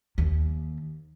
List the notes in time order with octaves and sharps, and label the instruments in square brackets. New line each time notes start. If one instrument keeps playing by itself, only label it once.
[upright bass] D#2